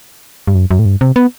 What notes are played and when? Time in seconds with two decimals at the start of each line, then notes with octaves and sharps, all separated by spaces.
0.47 G2
0.55 F#2
0.71 F#2
0.79 A2
0.85 G2
1.01 C3
1.16 B3